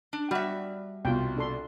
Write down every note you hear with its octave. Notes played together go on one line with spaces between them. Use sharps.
D4
G3 F#4 E5
C2 B2 F4 G5
D4 A4 C6